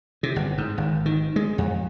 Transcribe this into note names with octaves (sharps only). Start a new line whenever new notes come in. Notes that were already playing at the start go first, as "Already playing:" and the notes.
C3
G1
G#2
G#1
D#3
G#3
F2